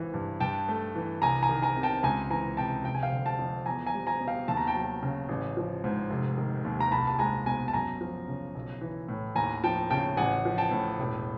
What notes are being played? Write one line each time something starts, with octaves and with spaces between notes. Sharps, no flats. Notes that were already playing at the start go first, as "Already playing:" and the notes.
Already playing: G#1 E3
G2
G2 G5 A5
A3
E3
C2 G#5 A#5
G#5 A#5
D#3
G#5 A#5
C3
G5 A5
C#2 G#5 A#5
E3 G#5 A#5
C3 G5 A5
F1 G5
G#5
F5 G5
D3
G5 A5
F2
E2 G#5 A#5
G#5 A#5
G3
G#5 A#5
B2
F5 G5
D#2 A5
A#5
G5 A5
F#3
C#3
A1
F3
G#2
F1
D#3
D#2
A#5
C2 A5 B5
A5
G#3 G#5 A#5
B2 G#5 A#5
A5
F#2 G#5 A#5
F3
C#3
B1
E3
A2
D#2 G#5 A#5
F3 G5 A5
C#3 G5 A5
A1 F#5 G#5
F3
G5 A5
A2
E1